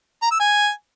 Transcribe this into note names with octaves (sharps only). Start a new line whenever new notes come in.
A#5
E6
G#5